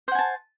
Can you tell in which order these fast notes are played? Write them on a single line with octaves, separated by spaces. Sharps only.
C5 F#5 G#5 A5